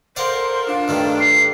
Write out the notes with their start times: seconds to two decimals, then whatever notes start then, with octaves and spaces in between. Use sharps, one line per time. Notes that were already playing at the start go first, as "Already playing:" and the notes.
0.16 A4 A#4 C5 D5 F5 F#5
0.67 D4 F4
0.88 G2 D#3 A3
1.20 C7